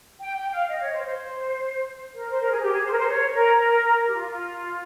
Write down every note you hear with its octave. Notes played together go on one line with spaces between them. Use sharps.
G5
G5
F5
D#5
C#5
C5
C5
A#4
C5
A#4
G#4
G4
G#4
C5
A#4
C5
C#5
A#4
A#4
G4
F4
F4